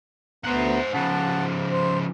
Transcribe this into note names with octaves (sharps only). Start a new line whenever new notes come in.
D2 B3 C5 F#5 A#5
C#3 F3 F#5 A5
C5